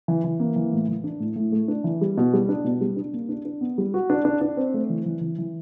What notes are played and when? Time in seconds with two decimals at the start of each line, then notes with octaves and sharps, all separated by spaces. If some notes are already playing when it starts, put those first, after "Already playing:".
0.08 E3
0.24 E3
0.40 A#3
0.56 E3
0.73 A2
0.88 E3
1.04 D4
1.20 A2
1.36 A2
1.52 A3
1.68 D4
1.84 E3
2.01 G3
2.17 B2
2.33 G3
2.49 D4
2.64 B2
2.81 G3
2.96 D4
3.14 A#3
3.29 D4
3.45 D4
3.61 B3
3.78 G3
3.94 F#4
4.10 D4
4.25 D4
4.41 D4
4.57 C4
4.74 A3
4.90 E3
5.06 E3
5.21 E3
5.38 E3